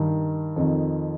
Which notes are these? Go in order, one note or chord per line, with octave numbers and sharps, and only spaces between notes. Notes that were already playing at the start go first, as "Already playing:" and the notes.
Already playing: G2 D#3
F2 D#3